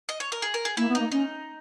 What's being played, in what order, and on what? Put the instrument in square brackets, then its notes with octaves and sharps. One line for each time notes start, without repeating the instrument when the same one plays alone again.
[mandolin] D#5
C#5
A#4
G#4
A#4
G#4
[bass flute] A#3 [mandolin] E4
[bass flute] B3
[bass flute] A#3 [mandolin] D#4
[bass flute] C#4 [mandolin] D#4